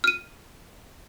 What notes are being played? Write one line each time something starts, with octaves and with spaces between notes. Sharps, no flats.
F6 D#7